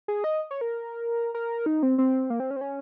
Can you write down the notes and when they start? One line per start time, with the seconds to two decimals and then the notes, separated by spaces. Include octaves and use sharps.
0.08 G#4
0.24 D#5
0.51 C#5
0.61 A#4
1.34 A#4
1.66 D#4
1.83 C4
1.98 C4
2.30 A#3
2.40 C4
2.51 C#4
2.56 C4
2.61 C#4